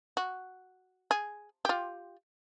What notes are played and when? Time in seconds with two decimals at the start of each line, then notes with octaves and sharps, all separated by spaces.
0.17 F#4
1.11 G#4
1.65 F4 G4